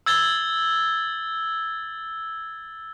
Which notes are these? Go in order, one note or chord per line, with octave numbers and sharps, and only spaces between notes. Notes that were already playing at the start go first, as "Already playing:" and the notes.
E6 G#6 A6 G7